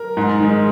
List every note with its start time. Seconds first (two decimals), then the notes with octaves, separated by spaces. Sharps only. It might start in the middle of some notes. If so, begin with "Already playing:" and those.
Already playing: A#4
0.17 G#2
0.40 D#3 G#3